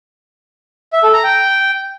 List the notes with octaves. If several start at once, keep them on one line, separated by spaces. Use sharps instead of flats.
E5
A4
A#5
G5